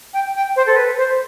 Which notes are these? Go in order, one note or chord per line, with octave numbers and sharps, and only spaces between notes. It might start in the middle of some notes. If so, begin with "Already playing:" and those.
G5
G5
C5
A4
B4
C5